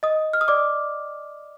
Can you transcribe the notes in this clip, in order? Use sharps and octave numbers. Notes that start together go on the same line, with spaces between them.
D#5 D#6
F6
D#6
D5 D6